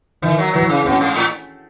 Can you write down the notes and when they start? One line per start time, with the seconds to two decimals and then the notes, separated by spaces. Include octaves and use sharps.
0.22 D#3 E3
0.38 F#3
0.53 E3 F#3
0.69 C#3
0.85 B2 C#4
1.01 G#2
1.16 A2